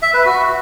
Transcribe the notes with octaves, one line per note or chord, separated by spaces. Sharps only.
E5
B4
F#4